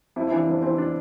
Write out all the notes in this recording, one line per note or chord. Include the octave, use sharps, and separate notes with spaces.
F2 E4
E4
E3 D4
F2 B3
E3 C4
D4